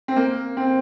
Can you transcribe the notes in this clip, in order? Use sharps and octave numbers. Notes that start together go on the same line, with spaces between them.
C4
A#3
C4